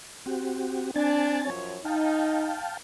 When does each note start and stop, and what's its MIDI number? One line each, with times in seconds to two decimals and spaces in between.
0.26 0.91 60
0.26 0.91 66
0.26 0.91 67
0.96 1.50 60
0.96 1.40 62
0.96 1.50 80
0.96 1.50 93
1.46 1.77 42
1.46 1.77 53
1.46 1.77 73
1.85 2.55 63
1.85 2.77 77
1.85 2.77 79
1.85 2.77 81